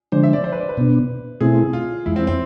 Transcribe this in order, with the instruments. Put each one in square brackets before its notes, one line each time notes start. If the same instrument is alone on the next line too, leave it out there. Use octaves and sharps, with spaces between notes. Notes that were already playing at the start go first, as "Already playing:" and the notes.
[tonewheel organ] D3 F3 G#3 D4 [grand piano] C5
[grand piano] E5
D5
C5
B4
D5
B4
[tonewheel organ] B2 B3 D4
[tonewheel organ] B2 A3 C4 E4 [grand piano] G#4
[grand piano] F4
[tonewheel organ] F2 E3 G#3 [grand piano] E4
[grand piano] C4
C4